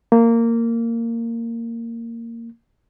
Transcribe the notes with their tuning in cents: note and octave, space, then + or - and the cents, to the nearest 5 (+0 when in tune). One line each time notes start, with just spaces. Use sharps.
A#3 -15